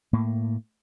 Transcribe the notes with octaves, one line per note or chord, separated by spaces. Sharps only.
A2 A#3